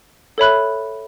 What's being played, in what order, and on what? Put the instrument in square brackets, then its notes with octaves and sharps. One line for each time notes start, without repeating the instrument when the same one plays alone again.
[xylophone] A4 C#5 E5 B5 F#6